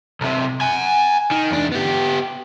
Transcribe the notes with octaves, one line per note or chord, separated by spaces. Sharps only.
B1 C3
F#5 G#5
D#3
E2 D4
B3 G4